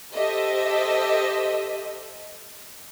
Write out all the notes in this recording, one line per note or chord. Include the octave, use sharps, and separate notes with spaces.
G4 A4 C5 D#5 E5